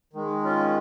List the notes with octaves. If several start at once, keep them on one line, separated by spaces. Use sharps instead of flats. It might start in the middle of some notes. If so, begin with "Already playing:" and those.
D#3 G#3
C#4 F4